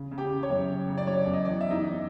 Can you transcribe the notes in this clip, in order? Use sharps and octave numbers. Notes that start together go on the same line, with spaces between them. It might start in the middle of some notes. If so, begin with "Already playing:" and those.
Already playing: C#3
C#3
G4 G5
C#3
C#5
F#2
C#3
C#3
D5
F#3 C#5
F#2
D#5
E2 D5
E2 E5
D#4 D#5
E2